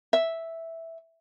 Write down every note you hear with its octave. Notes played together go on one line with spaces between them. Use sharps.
E5